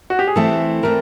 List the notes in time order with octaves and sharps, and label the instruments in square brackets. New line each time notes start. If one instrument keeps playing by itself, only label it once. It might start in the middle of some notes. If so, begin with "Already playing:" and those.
[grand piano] F#4
G4
G#4
[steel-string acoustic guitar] E3 A3 C4 E4 [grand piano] A4
[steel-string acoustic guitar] E3 A3 C4 [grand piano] A#4